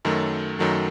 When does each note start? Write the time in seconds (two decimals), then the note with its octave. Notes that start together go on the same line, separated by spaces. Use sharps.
0.05 F#2 D#3 F#3 A3
0.59 F#2 D#3 F#3 A3